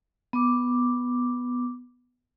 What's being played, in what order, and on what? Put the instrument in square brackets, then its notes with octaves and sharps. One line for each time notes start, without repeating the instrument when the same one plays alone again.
[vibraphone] B3 D6